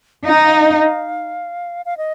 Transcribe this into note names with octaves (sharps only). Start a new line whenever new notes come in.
D#4 F5
D#5
F5
F5
D#5